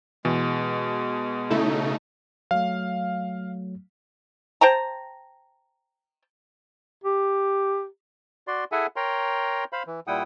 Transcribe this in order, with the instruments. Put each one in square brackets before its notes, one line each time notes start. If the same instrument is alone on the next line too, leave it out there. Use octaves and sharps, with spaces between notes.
[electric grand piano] B2 [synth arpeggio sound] E3 [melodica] G#3
[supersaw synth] C#3 A3 D#4 [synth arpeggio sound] E4 A4
[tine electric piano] F#3 A3 [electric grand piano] F5
[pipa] C5 G5 A5 A#5
[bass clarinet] G4
[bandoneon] F#4 D5 C6
E4 G#4 A4 E5 F#5 G#5
A#4 C#5 G5 A#5 C6
C5 F5 B5
E3
A#2 G3 E4 F#5 G5 D#6